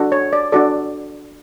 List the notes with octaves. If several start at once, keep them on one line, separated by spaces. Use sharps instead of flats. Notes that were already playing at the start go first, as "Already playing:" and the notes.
Already playing: D4 F#4 A4
C#5
D5
D4 F#4 A4 D5